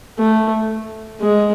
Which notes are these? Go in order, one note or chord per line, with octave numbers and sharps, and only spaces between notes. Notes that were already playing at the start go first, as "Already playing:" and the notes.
A3
G#3